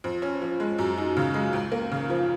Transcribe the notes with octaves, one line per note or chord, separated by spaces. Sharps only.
F2
C#4
F3
G#3
F#2
D#4
C#3
G#3
C#2
A#3
C#3
F3